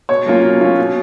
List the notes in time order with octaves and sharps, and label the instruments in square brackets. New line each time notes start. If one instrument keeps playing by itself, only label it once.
[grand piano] B2 [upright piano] C#5
[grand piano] F#3 A#3 C#4 F4
B2
F#3 A#3 C#4 F4
B2